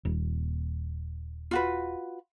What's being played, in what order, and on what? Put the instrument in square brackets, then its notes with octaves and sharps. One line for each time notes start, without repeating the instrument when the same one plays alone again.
[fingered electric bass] D#1
[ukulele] F4 F#4 B4